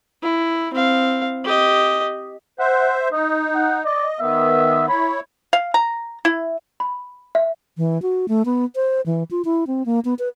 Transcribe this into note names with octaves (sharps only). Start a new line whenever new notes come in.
E4
C4 F5
G4 D#5
C5 E5 F#5
D#4 D#5
F#5
D5 D#5
D#3 B3 E5
E4 C#5 B5
F5
A#5
E4
B5
E5
E3
F#4
A3
B3
C5
E3
F4
E4
C4
A#3
B3
B4